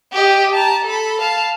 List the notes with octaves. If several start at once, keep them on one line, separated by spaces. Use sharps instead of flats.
G4 D#5
A5 A#5
A4 B5
F5 A5